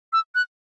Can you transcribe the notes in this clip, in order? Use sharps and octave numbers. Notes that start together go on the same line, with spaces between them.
E6
F#6